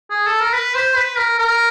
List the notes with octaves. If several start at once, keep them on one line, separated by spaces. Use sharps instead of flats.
G#4
A4
A#4
B4
C5
B4
A#4
A#4